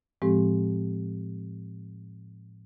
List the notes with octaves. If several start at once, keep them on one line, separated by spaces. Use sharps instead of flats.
A2 F3 G#3 C4 G4